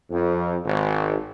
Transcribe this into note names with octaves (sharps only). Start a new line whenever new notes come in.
F2
G#1